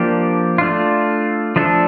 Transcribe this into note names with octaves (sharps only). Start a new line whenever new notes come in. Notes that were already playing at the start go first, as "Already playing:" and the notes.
Already playing: F3 A#3 D4 G4
A3 D4 F4
F3 A3 D4 A4